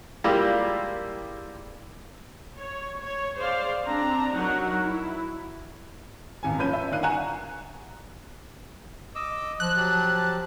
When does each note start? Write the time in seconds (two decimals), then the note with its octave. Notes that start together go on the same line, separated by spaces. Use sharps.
0.24 G3 G#3 A#3 E4 F4 G4
2.57 C#5
3.00 C#5
3.37 G#4 C5 D5 F5
3.85 C4 D4 A#5
4.35 F#3 D#4 F#4 A#4 F#5
4.83 E4
6.43 D#1 G#1 G#5
6.58 F#2 F3 B4 C#5 G6 D#7
6.73 E5
6.91 G1 D#3 D5 F5 F#6 D#7
7.03 F#5 G#5 A#5 C#6 F#6 E7
9.15 D#5 D6 E6
9.60 F3 F#6
9.76 F#3 G4 A5